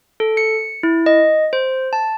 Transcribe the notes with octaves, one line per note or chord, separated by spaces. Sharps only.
A4
C#7
E4
D#5
C5
A5